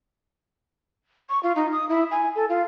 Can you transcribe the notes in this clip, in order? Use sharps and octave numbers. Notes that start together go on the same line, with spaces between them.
C#6
F4
D#4
D#6
E4
G#5
A4
F4